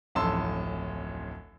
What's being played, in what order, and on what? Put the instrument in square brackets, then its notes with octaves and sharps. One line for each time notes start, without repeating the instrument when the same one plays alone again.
[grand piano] D1 A1 F2 A5 C6 E6